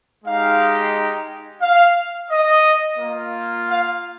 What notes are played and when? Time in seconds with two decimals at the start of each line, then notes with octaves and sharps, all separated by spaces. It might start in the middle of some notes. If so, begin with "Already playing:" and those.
0.25 G#3 D#4 G4 F5
1.62 F5
2.31 D#5
2.99 A#3 F4
3.68 F5